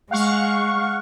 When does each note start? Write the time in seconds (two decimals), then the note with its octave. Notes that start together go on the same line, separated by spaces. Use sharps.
0.11 G#3 F5 F#5 C#6